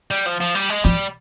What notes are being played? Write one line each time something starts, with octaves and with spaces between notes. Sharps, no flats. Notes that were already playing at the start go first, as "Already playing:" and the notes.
G3
F3
F3
G3
G#3
F3 G3